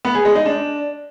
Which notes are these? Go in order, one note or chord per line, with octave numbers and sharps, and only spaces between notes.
B3
G#4
G#3
D#4
D4